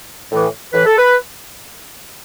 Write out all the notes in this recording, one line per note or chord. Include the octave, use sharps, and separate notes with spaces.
A2 E3
A2 E3 B4
A4
B4